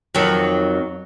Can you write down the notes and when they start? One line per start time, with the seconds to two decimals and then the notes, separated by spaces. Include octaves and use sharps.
0.15 F2 D#3 F#3